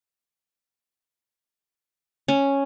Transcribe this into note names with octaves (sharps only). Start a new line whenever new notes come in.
C#4